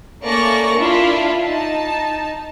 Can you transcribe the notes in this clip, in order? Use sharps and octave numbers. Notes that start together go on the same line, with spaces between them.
A3 A#3 C#4 D5 C#6 A#6
D4 E4 F4 E5
D#4 A5